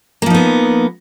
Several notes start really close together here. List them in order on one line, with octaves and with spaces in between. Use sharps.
A#3 F3 D#4 B3